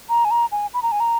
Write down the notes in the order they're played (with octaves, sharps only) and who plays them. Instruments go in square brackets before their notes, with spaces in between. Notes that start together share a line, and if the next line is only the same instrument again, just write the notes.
[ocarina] A#5
G#5
A#5
G#5
B5
A#5
G#5
A#5